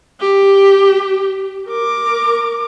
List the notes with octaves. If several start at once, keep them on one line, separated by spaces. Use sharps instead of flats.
G4
A#4 D6